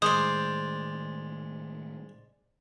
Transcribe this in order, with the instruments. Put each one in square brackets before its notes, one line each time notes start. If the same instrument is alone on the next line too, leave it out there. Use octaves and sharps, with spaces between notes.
[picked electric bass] A2 D#3 G3 [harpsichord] G#3 [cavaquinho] C5 D5 [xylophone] D#6